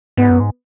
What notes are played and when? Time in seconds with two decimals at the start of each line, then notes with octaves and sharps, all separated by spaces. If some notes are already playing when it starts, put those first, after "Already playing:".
0.17 G#2 B3
0.29 F#2
0.40 G#2